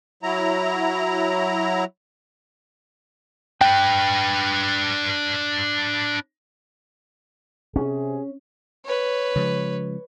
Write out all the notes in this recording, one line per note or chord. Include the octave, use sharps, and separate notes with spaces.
F#3 E4 A#5
D4 B4 G5
C3 C#4 G#4
B4 C#5
C#3 F3 G#3